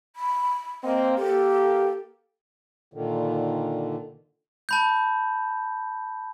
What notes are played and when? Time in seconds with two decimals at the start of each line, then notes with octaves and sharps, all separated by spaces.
0.16 B5
0.83 A#3 C4 D#5
1.18 A#3 G4 A4
2.94 A#2 D3 D#3
4.69 A5 B5 G6